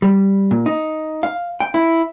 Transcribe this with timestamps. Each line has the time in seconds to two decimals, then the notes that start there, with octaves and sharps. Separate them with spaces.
0.02 G3
0.51 A#2
0.66 D#4
1.23 F5
1.60 G5
1.74 E4